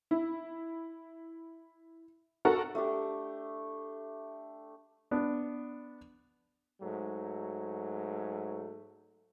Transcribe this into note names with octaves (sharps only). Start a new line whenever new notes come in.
E4
F#4 A4 A#4 F#5
A3 D4 G4
B3 D4
G#2 F#3 A3